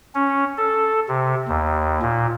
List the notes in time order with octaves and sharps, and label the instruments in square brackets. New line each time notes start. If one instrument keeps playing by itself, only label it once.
[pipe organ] C#4
A4
C3
D#2
A#2